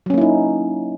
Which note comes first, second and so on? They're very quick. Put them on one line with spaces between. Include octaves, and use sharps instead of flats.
F#3 C#4 A#3 E4 D#4